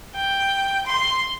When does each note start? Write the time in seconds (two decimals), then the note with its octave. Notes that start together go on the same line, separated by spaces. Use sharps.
0.15 G5
0.87 C6